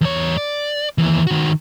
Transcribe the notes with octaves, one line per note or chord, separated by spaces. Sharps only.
E2 C#5
D5
D#2 E3
D#3 F#4